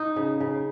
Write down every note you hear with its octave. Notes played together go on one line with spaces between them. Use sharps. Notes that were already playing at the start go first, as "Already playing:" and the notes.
Already playing: D#4
C#3
C#3